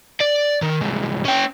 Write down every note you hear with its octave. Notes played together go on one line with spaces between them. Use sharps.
D5
D#3
C2 G#2
C#4 G5